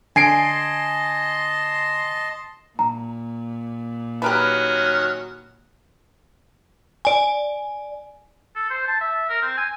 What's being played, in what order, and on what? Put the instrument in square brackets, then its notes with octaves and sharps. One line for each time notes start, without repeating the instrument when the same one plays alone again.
[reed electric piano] D3 [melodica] D#5 A5 C6 [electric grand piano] G#5 C7 D7
[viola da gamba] A#2 [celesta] A#5
[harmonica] D#3 F#3 C#4 [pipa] G4 A#4 B4
[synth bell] D5 G#5
[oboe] A4
C5
A5
E5
A#4
C4
G#5